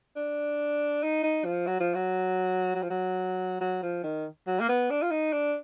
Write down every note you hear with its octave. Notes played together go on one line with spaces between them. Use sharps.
D4
D#4
D#4
F3
F#3
F3
F#3
F#3
F3
F#3
F#3
F3
D#3
F#3
A#3
B3
D4
F4
D#4
D4